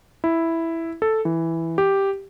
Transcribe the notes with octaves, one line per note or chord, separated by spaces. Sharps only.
E4
A4
E3
G4